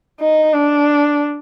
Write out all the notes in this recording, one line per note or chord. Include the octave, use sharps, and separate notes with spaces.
D#4
D4